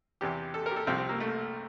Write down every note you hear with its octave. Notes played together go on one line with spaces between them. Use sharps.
E2 C3 E3 G4
A4
A#4
G4
A4
C2 C3 F3 C4
C4
A#3
A3